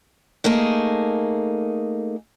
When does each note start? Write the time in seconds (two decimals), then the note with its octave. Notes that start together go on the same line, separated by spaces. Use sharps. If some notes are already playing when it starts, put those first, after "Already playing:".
0.44 A3 A#3 D#4 G#4